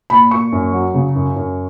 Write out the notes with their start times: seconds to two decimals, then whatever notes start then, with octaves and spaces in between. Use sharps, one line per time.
0.10 A#2 B5
0.31 A#3 C#6
0.52 F#2
0.73 F#3
0.94 C#3
1.15 F#2
1.36 F#2